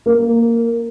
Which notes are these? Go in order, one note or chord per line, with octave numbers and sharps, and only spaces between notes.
A#3